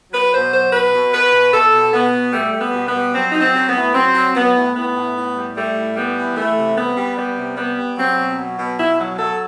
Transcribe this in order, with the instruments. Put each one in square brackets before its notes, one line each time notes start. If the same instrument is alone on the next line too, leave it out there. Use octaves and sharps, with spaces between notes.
[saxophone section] F#3 B4
B2 C5
F#3 C5
B2 B4
B2
B2 B4
B2
B2 A4
B2
B2 B3
B2
G3 A3
G3
B3
B2
B3
G3
F#3 C4
F#3 D#4
C4
F#3
B3
A2
F#3 C4
F#3
F#3 B3
A2
A2 B3
A2
A2
G3
G3 A3
A2
G3 B3
E3
E3 A3
C3
G3 B3
G3
G3 B3
C3
G3 B3
G3
F#3 C4
B2
F#3
B2
B2 E4
F#3
F#3 A4